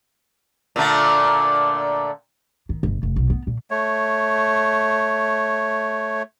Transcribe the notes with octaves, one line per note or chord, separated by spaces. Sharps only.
A#2 D3 A3
D#3
G1
F1
B1
B3
A#2
A3 C#5